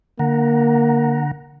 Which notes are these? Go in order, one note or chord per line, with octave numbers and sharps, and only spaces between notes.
D3 A#3 F#5 A#5